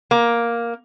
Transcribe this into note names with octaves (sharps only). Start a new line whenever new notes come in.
A#3